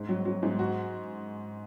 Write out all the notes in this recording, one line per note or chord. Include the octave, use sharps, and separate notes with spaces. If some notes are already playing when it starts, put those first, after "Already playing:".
Already playing: G#2
F#3
F#3
G#2
F#4